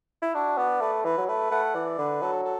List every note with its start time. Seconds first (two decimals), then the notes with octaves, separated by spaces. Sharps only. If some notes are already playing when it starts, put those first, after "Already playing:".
0.22 E4
0.34 D4 F#4
0.58 B3 D5
0.81 A3 B4
1.05 E3 B4
1.18 F#3
1.28 A3 B4
1.51 A3 F#5
1.74 E3 D5
1.98 D3 B4
2.22 F#3 A4
2.45 A4